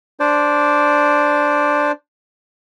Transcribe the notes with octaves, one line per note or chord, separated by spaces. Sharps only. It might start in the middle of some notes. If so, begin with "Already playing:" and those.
D4 C5 D5